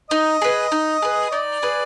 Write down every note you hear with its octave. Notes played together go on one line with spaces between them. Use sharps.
D#4 D#5
G#4 B4
D#4
G#4 B4
D#4 D5
G#4 B4